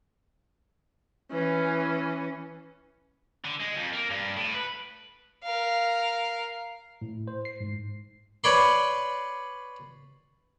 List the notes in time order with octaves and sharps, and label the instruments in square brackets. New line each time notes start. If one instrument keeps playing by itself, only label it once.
[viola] E3 C#4
[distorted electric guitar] D3
G#3
F2
A#3
G2
A2
B4
[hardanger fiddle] A#4 F5
[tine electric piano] A2
C5
C7
G#2
[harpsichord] B4 C#5 D5 B5 C6